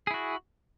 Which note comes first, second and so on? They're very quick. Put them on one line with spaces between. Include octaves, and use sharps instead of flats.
G#4 E4 F#4